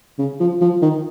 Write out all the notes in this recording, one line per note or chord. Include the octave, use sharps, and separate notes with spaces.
C#3
F3
F3
D#3